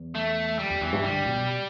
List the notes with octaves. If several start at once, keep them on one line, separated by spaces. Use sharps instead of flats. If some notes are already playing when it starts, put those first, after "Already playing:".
Already playing: E2
A3
G3
E2
E2 E3
G2
D3 G3
B2